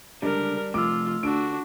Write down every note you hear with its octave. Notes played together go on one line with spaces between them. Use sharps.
C#2 D3 G3 D4 A#4
C3 F3 A3 F4 D6 E6
D3 D4 F#4 D7